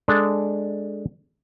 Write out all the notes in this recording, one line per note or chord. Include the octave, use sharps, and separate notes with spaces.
G#3 D4 A4 D5